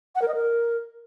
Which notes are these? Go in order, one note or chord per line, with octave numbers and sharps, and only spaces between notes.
F#5
A#4
D#5
A#4